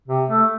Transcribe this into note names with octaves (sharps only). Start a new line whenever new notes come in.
C3
A3